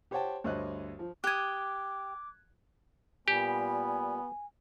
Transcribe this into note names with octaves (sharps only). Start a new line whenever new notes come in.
G4 C5 C#5 F#5 G5 A5
D2 G2 C5 C#5 D#5 F#6
F3
G4 D6 D#6 F#6 G#6
A#2 G3 B3 G4 G#5